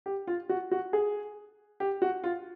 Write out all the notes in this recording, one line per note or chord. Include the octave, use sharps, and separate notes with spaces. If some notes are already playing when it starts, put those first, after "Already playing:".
G4
F4
F#4
F#4
G#4
G4
F#4
F4